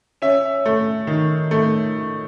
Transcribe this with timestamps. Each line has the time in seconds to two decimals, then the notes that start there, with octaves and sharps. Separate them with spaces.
0.22 C#4 E5
0.65 A3
1.07 D#3
1.51 A3